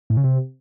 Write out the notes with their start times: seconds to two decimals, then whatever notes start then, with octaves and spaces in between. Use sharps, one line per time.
0.10 A2
0.17 C#3
0.24 C3